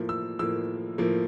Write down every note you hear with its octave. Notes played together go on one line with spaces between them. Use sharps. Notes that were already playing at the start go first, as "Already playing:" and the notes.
Already playing: A2 F3 A#3
E6
A2 F3 A#3 E6
A2 F3 A#3